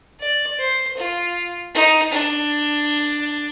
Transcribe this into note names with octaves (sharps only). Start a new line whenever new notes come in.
D5
C5
F4
D#4
D4